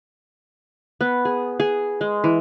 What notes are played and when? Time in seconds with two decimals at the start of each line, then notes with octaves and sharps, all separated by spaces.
1.01 B3
1.25 G#4
1.60 G#4
2.01 G#3
2.24 E3